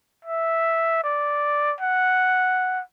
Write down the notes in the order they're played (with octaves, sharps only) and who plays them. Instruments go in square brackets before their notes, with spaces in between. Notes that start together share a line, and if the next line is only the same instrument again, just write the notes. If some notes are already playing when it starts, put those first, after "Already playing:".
[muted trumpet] E5
D5
F#5